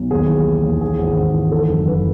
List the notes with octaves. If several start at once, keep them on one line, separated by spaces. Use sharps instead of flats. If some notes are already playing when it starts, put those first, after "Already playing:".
Already playing: B1
D#2 G#4
E3
E3
D#2
E3 G#4
G#1
G#1
E3
D#3 A4
F#1
F#1 B4